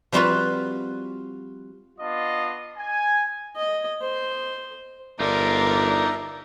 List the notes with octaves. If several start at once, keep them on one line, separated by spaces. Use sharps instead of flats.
F3 G3 C4 F4 F#4 B4
B3 D4 F4 D#5
G#5
D#5
C5
G1 D4 D#4 F4 A#4 D5 E5 A#5